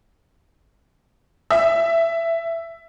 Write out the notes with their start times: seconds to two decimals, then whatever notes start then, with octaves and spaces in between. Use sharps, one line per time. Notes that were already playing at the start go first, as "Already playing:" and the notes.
1.50 E5